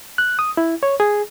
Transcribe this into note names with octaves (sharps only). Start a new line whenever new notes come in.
F#6
D#6
E4
C#5
G#4